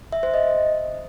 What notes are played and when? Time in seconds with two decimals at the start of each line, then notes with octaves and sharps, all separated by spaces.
0.12 E5
0.23 C5
0.34 D#5